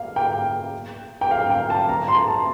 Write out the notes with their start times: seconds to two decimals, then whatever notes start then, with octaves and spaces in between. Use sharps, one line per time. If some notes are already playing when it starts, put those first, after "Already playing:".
Already playing: F5
0.16 G5
1.21 G5
1.31 F5
1.50 G5
1.70 A5
1.89 A#5
2.08 C6
2.28 A5